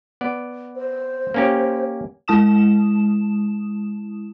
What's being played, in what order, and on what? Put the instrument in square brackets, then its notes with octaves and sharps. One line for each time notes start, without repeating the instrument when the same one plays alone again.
[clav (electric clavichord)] B3 D5
[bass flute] C5
[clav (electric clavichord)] A#3 C#4 G4
[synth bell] G#3 E4 A5 D#6 E7